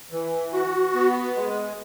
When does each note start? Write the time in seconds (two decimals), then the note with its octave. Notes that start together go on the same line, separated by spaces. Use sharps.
0.12 E3
0.53 F#4
0.94 B3
1.36 G#3